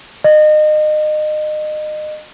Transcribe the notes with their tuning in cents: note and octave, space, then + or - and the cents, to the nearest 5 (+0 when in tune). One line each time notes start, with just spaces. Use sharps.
D#5 -30